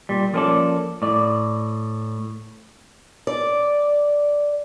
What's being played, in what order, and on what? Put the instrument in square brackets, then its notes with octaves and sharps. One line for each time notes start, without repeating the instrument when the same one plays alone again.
[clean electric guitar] A#2 G3
F3 A#3 C#4 G#4 A4 D5
A2 D5
[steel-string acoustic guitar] D5